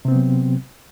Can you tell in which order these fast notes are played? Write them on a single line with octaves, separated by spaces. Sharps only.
C3 C4 B3 F#3